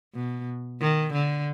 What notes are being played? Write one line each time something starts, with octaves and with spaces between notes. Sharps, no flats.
B2
D#3
D3